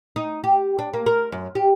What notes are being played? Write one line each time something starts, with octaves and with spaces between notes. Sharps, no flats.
D#4
G4
D4
A#3
A#4
F#2
G4